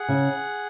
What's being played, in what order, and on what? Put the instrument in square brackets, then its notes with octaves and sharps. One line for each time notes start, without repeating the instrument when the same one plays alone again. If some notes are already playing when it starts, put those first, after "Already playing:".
Already playing: [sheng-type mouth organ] G#4 F#5
[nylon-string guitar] C#3